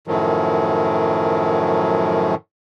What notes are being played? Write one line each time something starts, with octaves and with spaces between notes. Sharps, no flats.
F#2 A2 D#3 F3 F#3